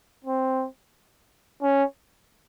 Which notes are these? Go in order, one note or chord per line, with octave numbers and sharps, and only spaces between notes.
C4
C#4